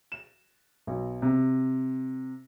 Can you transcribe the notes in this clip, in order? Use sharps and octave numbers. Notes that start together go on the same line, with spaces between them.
E7
B1
C3